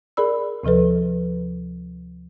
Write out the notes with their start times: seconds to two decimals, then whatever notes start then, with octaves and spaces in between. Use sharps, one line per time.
0.17 G#4 A#4 D5 B5 E6
0.63 D2 C3 F3 A4 B4